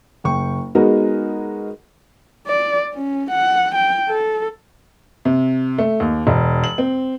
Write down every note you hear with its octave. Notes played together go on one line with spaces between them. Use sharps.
F#1 G5 C#6
G#3 B3 D#4 F#4 A#4
D5
C#4
F#5
G5
A4
C3
A3
D#2
E1
F#7
C4